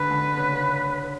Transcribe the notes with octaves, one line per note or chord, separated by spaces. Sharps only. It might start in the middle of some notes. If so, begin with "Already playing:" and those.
Already playing: D3 B4
D3
C#3